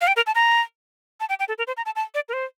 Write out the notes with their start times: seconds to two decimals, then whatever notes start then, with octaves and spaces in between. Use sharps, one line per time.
0.01 F5
0.07 G5
0.16 A#4
0.27 A5
0.35 A#5
1.20 A5
1.29 G5
1.39 G5
1.48 A4
1.58 A#4
1.67 C5
1.77 A#5
1.86 A5
1.96 A5
2.14 D5
2.29 A#4
2.33 C5